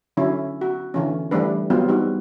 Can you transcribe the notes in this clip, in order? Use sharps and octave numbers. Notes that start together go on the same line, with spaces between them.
D3 F#3 C#4 E4
F#4
D3 E3 C#4
E3 G3 A3 D4 B4
F#3 G3 B3 C4 F4
G3 D#4 F#4